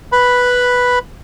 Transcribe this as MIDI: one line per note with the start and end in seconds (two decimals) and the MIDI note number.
0.12 0.99 71
0.12 0.99 83